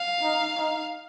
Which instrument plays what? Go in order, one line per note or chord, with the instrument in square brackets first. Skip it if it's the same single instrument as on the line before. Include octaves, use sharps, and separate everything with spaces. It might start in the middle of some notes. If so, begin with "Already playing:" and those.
Already playing: [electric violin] F5
[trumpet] D#4
D#4